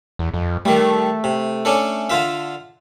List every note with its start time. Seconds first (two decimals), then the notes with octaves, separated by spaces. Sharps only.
0.19 E2
0.34 F2
0.65 D#3 G3 A3
1.24 C3
1.65 C#4 D4 A4
2.10 D3 F4 E5